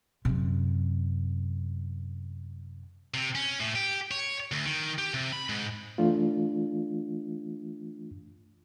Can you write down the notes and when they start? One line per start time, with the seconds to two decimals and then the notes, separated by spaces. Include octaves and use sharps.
0.25 F#2 C3
3.14 C3
3.35 C#4
3.60 A2
3.76 G4
4.11 C#5
4.52 D2
4.66 D#3
4.98 G4
5.14 C3
5.33 B5
5.49 G#2
5.98 E3 A3 D4 F4